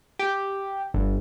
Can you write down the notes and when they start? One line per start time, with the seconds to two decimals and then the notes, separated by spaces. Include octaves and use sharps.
0.19 G4
0.94 G1